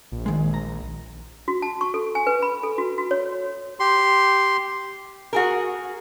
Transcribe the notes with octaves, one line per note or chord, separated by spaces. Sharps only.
A#1
D#3 G#3
A#5
F#4
A5
C#6
A4
G#5
B4
B5
A4
F#4
F#4
C#5
G4 C6
F#4 G#4 A#4